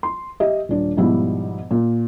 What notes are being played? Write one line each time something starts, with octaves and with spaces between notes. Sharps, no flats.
C6
G4 D#5 E5
D#1 D4
G#2 B2 F3 G3 B3 E4
A#2